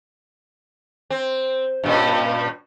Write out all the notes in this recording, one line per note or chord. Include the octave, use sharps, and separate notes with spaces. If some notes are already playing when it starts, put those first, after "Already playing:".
C4
G2 A#2 C#4